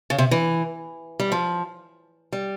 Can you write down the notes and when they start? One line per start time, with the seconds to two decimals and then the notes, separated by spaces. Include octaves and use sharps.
0.10 C#3
0.18 C3
0.31 E3
1.20 G3
1.32 F3
2.32 G3